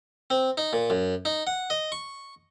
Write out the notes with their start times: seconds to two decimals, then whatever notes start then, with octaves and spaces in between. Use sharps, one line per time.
0.30 C4
0.58 D#4
0.73 A#2
0.90 F#2
1.25 D#4
1.47 F#5
1.70 D#5
1.92 C#6